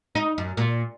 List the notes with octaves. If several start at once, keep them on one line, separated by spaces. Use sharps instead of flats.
D#4
F#2
A#2